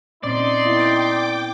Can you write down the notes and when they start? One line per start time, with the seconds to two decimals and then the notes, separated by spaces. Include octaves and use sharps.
0.24 A#2 C4 C#4 D#4 D5 C6
0.65 B3 E4 F5 G5 D6